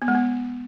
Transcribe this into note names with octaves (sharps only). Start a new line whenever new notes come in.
B3
G#3
B3